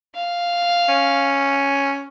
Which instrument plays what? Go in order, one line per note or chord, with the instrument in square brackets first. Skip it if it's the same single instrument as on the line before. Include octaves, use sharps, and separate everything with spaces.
[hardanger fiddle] F5
[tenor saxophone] C#4